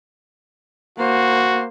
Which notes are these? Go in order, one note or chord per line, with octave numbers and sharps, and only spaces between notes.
A#3 F#4 C5